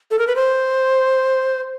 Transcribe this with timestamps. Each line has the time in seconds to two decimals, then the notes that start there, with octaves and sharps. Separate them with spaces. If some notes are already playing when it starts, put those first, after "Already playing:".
0.11 A4
0.19 A#4
0.27 B4
0.36 C5